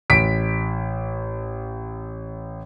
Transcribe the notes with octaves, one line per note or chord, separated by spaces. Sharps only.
A1 B6 D7